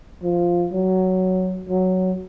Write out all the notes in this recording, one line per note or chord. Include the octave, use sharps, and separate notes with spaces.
F3
F#3
F#3